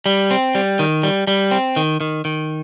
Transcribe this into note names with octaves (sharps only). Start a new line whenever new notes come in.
G3
C4
G3
D#3
G3
G3
C4
D#3
D#3
D#3